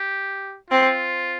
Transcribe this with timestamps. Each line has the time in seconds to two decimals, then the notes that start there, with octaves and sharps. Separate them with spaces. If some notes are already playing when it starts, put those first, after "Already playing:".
Already playing: G4
0.71 C4 F4